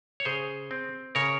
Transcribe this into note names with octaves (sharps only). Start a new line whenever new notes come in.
C#5
C#3 G#4 C5
C4
C#3 A#4 C#5